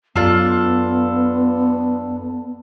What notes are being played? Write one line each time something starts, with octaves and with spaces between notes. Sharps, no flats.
F#2 B3 D4 F4 A4